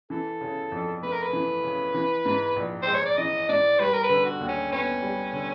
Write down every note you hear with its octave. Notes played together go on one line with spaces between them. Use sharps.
E3 A4
C#3
F2
A3 B4
A#4
B4
E3
C#3
E3
G#2
A#1
G#3 C5
C#5
D5
E3 D#5
G#2 D5
G3 B4
A#4
B4
D3
F#4
D#2
C#4
B3 C#4
G3
D3